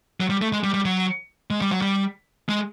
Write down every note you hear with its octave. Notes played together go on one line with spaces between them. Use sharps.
F#3
G3
A3
G#3
G3
G3
F#3
G#3
G3
F#3
G3
G#3